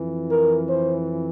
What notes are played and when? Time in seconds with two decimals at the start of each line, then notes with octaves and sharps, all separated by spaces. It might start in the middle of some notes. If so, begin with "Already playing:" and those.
Already playing: F2 E3
0.30 A#4
0.69 C5